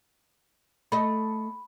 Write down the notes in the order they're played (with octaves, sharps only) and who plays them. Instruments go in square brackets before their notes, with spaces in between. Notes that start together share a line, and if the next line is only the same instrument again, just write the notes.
[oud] A3 D#5 [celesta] B5